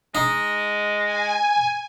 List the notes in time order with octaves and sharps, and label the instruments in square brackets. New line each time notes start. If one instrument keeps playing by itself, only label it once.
[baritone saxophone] G#3 [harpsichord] D#4
[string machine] G#5